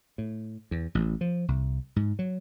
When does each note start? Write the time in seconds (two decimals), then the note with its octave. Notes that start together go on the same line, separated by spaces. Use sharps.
0.18 A2
0.71 E2
0.95 A1
1.21 F3
1.48 C2
1.96 G#2
2.19 F#3